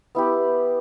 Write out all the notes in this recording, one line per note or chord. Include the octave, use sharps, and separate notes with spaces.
B3 E4 G4